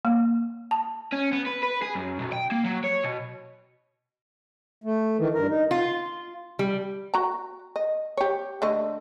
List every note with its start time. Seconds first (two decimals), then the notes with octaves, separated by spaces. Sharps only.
0.05 A#3
0.71 A5
1.12 C#4
1.32 B3
1.46 B4
1.63 B4
1.82 G#4
1.95 F#2
2.20 B1
2.32 G5
2.52 A#3
2.65 F#3
2.84 C#5
3.04 B2
4.84 A3
5.18 D#3 E3
5.34 G2 A#4
5.49 D#4
5.71 F4
6.59 G3
7.14 F#4 A#5
7.76 D#5
8.17 G4 C#5
8.62 D3 A3 D#5